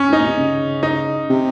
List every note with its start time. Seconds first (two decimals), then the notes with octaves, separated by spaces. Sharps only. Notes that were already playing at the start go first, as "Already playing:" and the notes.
Already playing: C#4
0.08 G#2
0.13 D#4
0.18 A#2
0.27 C3
0.36 C#3
0.83 D#4
1.30 C3